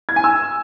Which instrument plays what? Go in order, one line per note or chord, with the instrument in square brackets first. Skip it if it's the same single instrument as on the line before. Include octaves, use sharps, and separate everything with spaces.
[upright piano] G#6
G#5
E6